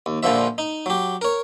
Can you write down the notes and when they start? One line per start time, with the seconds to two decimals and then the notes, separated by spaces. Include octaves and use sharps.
0.06 D#2
0.23 A#1 A#2 D3 F3 E5
0.58 D#4
0.86 F#3 G4
1.21 A#4 C#5